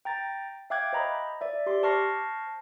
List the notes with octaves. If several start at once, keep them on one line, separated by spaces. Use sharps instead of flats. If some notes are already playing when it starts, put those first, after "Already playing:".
G5 A#5 A6
E5 F5 G5 D6 F#6 G#6
C5 D#5 A#5 B5
D5 E5
G4 C6 D6
C5 A5 C#6 F6 A#6 C7